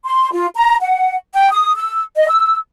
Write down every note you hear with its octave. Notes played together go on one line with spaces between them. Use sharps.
C6
F4
A#5
F#5
G5
D#6
E6
D#5
E6